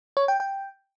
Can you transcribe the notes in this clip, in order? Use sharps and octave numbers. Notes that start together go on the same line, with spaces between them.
C#5
G5
G5